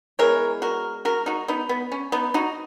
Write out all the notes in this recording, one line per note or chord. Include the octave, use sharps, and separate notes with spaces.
E3 G#3 B3 A#4 C#5
F#4 A#4
F#4 A#4
D#4 F#4
B3 D#4
B3
C#4
B3 D#4
D#4 F#4